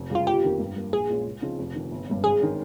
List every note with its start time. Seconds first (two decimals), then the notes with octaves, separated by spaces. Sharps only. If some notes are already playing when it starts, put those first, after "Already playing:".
Already playing: F1
0.10 F2 C#3 G3 F4
0.27 G1 G4
0.43 F2 D#3 A#3
0.60 G2
0.76 G3 A#3
0.93 A#1 G#4
1.09 A#2 G#3 C#4 F4
1.25 C#2
1.42 C#3 F3 C4 D#4
1.58 F1
1.75 F2 D#3
1.92 G1
2.07 G2 G3 C#4
2.24 G#1 G#4
2.40 D#3 G#3 C#4